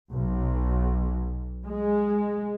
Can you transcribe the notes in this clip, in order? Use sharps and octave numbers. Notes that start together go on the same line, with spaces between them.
B1
G#3